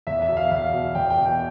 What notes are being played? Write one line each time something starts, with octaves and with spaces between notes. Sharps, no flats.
E2 E5
E5
B2
F5
E2 F5
B2
E2 G5
G5
B2
G5